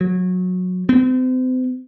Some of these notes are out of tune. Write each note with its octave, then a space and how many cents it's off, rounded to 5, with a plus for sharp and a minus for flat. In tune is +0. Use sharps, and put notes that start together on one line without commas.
F#3 -20
C4 -40